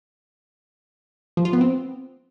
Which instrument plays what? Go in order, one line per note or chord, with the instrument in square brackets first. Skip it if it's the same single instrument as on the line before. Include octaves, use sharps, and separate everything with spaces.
[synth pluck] F3
F4
B3
C4